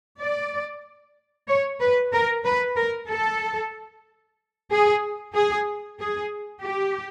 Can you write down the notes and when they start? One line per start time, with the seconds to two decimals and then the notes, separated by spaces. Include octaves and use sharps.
0.20 D5
1.48 C#5
1.81 B4
2.13 A#4
2.45 B4
2.77 A#4
3.09 A4
4.71 G#4
5.34 G#4
6.00 G#4
6.63 G4